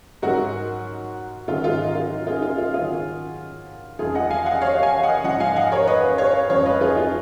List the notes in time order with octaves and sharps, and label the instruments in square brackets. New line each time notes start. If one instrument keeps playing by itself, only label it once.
[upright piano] G#2 F#3 F#4 A#4
G#2 D#3 F#3 F4
F4
D#4
F4
F4 G#4
F4
F4
F#2 D#3 F#3 F4 G#4
F2 C#3 F3 F4 G#4
D#5 F#5
F5 G#5
D#5 F#5
C#5 F5
F5 G#5
D#5 F#5
G#2 F3 D#5 F#5
F5 G#5
D#5 F#5
A#4 C#5
B4 D#5
C#5 F5
F2 C#3 F3 C#5 F5
B4 D#5
F4 G#4
F4